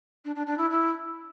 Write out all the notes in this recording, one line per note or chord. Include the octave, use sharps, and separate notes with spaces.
D4
D4
D4
E4
E4